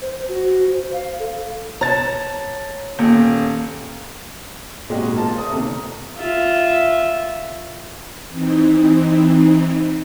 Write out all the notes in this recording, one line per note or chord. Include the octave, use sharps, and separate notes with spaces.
C5
F#4
C5
F5
A4
C#5 A5 A#5 A6
D#1 A#3
G#1 A#2 G#3 F#4 G4 D#5
A#3 C4 F4 A5 A#5
A3 D5 A#5 D#6
D#2 C3 A4 A#5
F4 E5
E3 C4 D#4